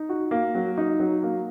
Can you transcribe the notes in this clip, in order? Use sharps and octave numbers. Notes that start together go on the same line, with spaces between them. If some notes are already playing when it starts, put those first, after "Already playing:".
Already playing: D#4
F#4
A#3
F#3
D#4
F#3
A#3